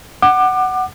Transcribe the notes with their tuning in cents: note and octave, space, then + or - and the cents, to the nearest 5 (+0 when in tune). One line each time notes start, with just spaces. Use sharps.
F#5 +10 D6 +30